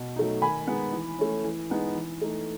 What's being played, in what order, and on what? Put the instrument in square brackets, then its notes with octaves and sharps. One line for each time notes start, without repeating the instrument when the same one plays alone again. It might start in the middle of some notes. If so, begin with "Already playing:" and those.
Already playing: [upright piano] B2
F#3 A3 D#4
D#3 G#5 B5
G#3 B3 D#4
E3
A3 C#4
E3
G#3 B3 D#4
E3
A3 D#4